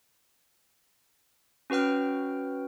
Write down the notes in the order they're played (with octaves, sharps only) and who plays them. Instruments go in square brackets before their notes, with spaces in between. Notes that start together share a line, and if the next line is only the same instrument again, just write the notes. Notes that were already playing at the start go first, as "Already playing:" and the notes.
[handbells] C#4 F#4 B4 G5 F6